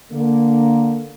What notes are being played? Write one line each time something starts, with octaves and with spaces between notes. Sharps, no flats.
D3 A#3